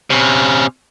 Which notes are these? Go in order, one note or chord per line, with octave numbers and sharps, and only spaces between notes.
C3 C#4